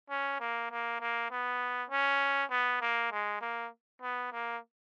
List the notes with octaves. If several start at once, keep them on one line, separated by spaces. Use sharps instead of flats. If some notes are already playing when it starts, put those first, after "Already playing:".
C#4
A#3
A#3
A#3
B3
C#4
B3
A#3
G#3
A#3
B3
A#3